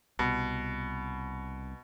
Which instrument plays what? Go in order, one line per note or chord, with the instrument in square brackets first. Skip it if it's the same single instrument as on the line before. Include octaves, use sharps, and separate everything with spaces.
[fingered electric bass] C2 [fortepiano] B2